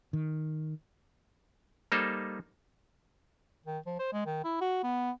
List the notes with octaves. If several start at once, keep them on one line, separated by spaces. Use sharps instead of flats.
D#3
G3 A#3 D#4 A4 C5
D#3
F3
C5
G#3
D#3
E4
F#4
B3